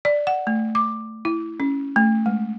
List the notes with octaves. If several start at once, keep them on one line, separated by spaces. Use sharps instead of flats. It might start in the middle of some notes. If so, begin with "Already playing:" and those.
D5
F#5
A3
D6
E4
C#4
A3
G#3